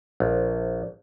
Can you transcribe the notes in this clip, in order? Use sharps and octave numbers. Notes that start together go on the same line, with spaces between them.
A#1